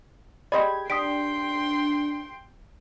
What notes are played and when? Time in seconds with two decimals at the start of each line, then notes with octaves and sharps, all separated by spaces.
0.52 G4 G#4 D5 D#5 B5 C6 G#6
0.90 D4 G4 G5 C6 D#6 B6 D7